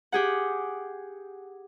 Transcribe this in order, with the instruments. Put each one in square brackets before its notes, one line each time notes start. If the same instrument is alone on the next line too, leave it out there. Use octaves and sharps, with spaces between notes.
[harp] G4 G#4 F#5